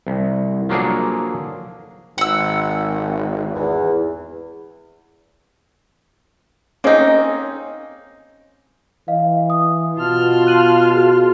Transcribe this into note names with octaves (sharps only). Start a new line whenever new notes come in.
C2
F3 F#3 A#3 D4 G#4 A4
G#1 F#5 E6
E2
A#3 C4 C#4 D#4 G#4
E3 D#5 F5
D#6
B2 F4 A5 F6
F#6 D#7 F#7
F#4 G#4